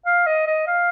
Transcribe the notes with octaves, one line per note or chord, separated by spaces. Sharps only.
F5
D#5
D#5
F5